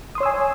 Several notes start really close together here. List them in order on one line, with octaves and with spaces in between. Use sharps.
D#6 C6 C#5 E6 G#5